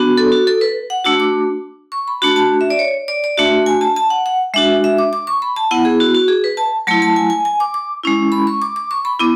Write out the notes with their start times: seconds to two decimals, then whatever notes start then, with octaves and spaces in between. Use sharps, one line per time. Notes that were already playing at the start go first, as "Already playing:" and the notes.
Already playing: B3 D4 F#4
0.17 A4
0.32 F#4
0.47 A4
0.61 B4
0.90 F#5
1.05 A3 D4 F#4 E6
1.20 D6
1.92 C#6
2.08 B5
2.22 A3 D4 F#4 B5
2.36 A5
2.61 E5
2.70 D5
2.79 C#5
3.08 D5
3.24 D5
3.37 A3 D4 F#4 E5
3.66 G#5
3.81 A5
3.96 A5
4.10 F#5
4.26 F#5
4.54 G#3 D4 F#4 E5
4.84 E5
4.98 D6
5.13 D6
5.27 C#6
5.42 B5
5.56 A5
5.71 B3 E4 F#5
5.85 G#4
6.00 F#4
6.14 F#4
6.28 G#4
6.44 B4
6.57 A5
6.87 F#3 A3 E4 A5
7.02 A5
7.16 G#5
7.30 G#5
7.45 G#5
7.60 D6
7.74 D6
8.03 G#3 C#4 E4
8.32 B5
8.47 C#6
8.62 D6
8.76 D6
8.91 C#6
9.05 B5
9.19 B3 E4 D6